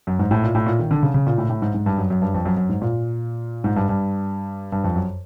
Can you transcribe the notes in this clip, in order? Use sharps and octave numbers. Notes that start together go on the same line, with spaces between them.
F#2
G#2
A2
A#2
A2
A#2
D#3
D3
C#3
C#3
A#2
A2
A2
G#2
G#2
G2
F#2
F#2
G2
F2
F#2
F#2
G#2
A#2
G#2
G2
G2
G2
F2
F#2